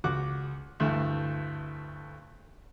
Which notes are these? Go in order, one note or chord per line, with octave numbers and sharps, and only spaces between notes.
C#2 F#4 F#5 D6
D2 G2 E3 A3 E5